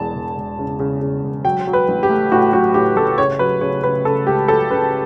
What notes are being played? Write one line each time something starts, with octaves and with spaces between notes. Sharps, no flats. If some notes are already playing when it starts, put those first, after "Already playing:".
Already playing: E1 E2 A5
E1
E1
C#3
C#3
C#3
E1
F#3 G5
F#3
B4
A1
G4
A3
A2 F#4
F#3 F#4
A2 G4
A1 A4
C#3 C#5
F#3 B4
C#3 C#5
C#3 B4
C#3 A4
C#2 G4
F#3 A4
C#3 B4